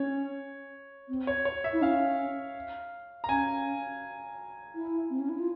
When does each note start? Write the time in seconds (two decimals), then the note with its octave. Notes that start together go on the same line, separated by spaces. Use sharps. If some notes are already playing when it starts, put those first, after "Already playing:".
Already playing: C#4 C#5
1.09 C4
1.27 C#5
1.45 C#5
1.64 E5
1.73 E4
1.82 C#4 F5
3.24 A#5
3.29 C#4 G#5
4.75 E4
5.10 C4
5.19 C#4
5.29 E4
5.39 F4